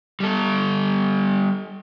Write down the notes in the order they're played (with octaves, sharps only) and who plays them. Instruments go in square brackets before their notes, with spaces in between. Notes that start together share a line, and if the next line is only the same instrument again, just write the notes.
[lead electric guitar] G3 A4